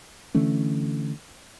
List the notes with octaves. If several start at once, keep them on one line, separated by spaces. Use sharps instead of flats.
D3 E3 A3 C#4